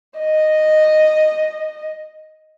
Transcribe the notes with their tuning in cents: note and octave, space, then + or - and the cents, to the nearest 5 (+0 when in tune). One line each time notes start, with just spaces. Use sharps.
D#5 -5